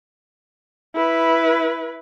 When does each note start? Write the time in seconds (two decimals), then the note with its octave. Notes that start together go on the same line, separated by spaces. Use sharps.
0.95 E4 B4